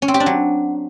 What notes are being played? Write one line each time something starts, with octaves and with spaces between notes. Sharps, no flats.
C#4
C4
G4
D4
F#3